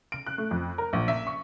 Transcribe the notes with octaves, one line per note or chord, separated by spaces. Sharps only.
D7
F#6
A3
F2
A#4
A#1
E5
C#6